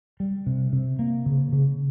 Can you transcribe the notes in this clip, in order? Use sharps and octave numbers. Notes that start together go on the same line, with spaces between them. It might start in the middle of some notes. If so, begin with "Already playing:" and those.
G3
C3
C3
A#3
C#3
C#3